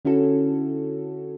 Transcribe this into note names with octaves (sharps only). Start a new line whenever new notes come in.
D3 C#4 E4 F#4 A4